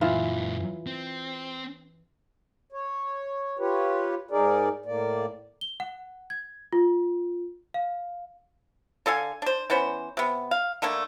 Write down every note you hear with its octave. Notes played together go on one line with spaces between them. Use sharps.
F#2 A#2 E3 F4
C4
C#5
F4 G4 B4 C#5
G#2 D#4 G#4 A#4 D5
A2 A#3 D5
G7
F#5
G#6
F4
F5
D3 A4 F5 G#5
D4 C5
E3 B3 C#4 C5
C3 B3
F5
D3 A3 A#3 D4